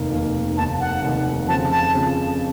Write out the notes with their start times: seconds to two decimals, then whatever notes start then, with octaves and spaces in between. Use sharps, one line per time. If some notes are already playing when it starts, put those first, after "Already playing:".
Already playing: F1 D#2 D#3 A#3
0.11 F1 D#2 D#3 A#3
0.56 F1 D#2 D#3 A#3 A5
0.80 F#5
1.02 F1 D#2 D#3 A#3
1.48 F2 C#3 F3 A5
1.72 A5
1.94 F2 C#3 F3